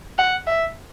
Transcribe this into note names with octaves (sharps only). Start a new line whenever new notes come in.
F#5
E5